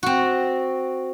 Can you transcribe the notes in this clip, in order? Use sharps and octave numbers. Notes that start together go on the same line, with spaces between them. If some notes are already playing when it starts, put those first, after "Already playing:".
C4 F#4